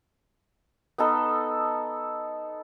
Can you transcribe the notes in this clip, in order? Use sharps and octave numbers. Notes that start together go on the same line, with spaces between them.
B3 D#4 A4